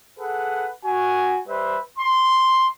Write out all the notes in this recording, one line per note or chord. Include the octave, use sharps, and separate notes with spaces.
G#4 A4 B4 F#5
F#4 G#5
G3 B4 C5 E5
C6